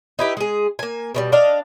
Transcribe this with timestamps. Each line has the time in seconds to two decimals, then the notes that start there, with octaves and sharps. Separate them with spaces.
0.19 D#4 E4 G4 B4
0.37 G#3 G#4
0.79 A#3 G#5
1.15 B2 D#3 G3
1.32 D4 D5 D#5 F5